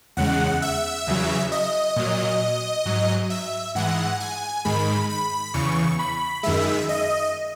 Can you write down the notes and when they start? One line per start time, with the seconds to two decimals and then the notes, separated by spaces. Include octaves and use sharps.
0.17 E2 C#3 G#3 F#5
0.62 E5
1.07 E2 C#3 F#3
1.52 D#5
1.96 A#2 F#3
2.85 G#2 F#3
3.30 E5
3.75 G#2 E3 G#3 F#5
4.20 G#5
4.65 G#2 D#3 G#3 B5
5.10 B5
5.54 E2 C#3 E3 C#6
5.99 B5
6.43 F#2 D#3 G#3 E5
6.89 D#5